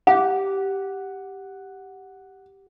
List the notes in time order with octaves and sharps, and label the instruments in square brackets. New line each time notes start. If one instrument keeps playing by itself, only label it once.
[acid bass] G4 [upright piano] F#5